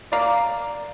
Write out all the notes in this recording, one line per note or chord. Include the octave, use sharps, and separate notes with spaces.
A#3 D5